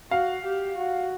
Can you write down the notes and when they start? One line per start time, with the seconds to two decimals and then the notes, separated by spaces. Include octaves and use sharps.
0.11 F#4 F5
0.45 G4
0.77 F#4